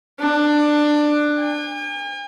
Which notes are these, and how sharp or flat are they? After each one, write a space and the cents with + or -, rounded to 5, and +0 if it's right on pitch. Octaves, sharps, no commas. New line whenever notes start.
D4 +15
G#5 -45